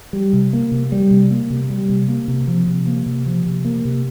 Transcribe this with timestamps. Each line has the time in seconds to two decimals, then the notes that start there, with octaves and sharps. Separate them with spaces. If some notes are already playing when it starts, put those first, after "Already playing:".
0.13 G3
0.33 C3
0.53 A#3
0.72 C3
0.92 G3
1.11 C3
1.31 A#3
1.50 C3
1.70 G3
1.89 C3
2.08 A#3
2.28 C3
2.47 F3
2.68 C3
2.87 A#3
3.06 C3
3.26 F3
3.46 C3
3.65 A#3
3.85 C3